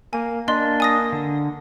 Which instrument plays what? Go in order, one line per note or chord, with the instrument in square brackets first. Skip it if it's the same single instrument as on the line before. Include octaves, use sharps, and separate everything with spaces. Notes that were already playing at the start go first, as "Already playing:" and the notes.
[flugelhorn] A#3 [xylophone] G#5
[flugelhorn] A#3 [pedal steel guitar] D4 [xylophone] D#5 C6
[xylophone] G#5 D#6 A#6
[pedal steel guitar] D3